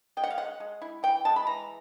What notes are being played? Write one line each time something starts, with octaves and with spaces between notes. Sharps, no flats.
G#3 G5
F#5
F5
G#3 F#5
G#3
E4
E3 G5
G#3 A5
B5
E3 A#5